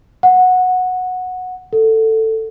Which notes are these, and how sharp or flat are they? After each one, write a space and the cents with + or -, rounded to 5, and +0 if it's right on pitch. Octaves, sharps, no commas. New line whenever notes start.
F#5 -10
A4 +10